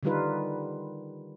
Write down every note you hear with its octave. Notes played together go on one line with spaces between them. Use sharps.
D3 D#3 G3 D#4 F4 B4